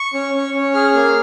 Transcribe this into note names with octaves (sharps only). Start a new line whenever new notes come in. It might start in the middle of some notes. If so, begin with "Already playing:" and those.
Already playing: C#6
C#4
C#4
C#4
G#4 F6
A#3